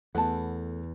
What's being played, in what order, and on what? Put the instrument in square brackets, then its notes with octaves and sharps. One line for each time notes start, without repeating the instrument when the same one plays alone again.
[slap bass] E2 [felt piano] A3 B3 [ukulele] F#5 A5